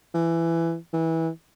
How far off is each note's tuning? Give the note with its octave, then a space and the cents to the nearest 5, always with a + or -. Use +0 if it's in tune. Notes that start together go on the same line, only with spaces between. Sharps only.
E3 +15
E3 -20